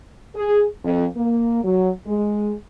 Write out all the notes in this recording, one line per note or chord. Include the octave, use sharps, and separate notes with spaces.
G#4
F2
A#3
F#3
G#3